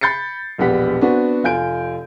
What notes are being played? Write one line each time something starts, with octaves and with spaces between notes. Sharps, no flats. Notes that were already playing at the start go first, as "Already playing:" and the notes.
B5 G6 A6 C7 C#7
E1 A#1 B3 G4 F#5 B6
B3 C4 D4 F#4
F1 F4 G#5 G6 D7